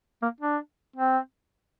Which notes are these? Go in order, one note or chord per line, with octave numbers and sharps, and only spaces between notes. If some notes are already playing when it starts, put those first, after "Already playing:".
A#3
D4
C4